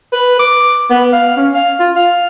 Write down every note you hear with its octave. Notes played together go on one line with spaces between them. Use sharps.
B4
D6
B3
F5
C#4
F5
F4
F5